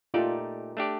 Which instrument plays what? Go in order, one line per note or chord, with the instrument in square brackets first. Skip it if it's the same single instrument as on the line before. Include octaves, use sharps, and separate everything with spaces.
[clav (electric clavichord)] A#2 A3 D#4 G4 D5 [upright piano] F4
[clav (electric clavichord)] A3 D4 G4 D5